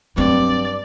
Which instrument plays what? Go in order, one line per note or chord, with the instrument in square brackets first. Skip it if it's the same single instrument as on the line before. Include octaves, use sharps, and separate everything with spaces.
[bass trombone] G2 [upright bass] F#3 C4 [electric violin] D5